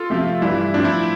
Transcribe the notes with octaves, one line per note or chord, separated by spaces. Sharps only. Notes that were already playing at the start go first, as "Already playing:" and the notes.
Already playing: F4 A4
C3 F3 A3 C4
G2 E3 G3 D4 E4
A2 F3 C4 D4
E4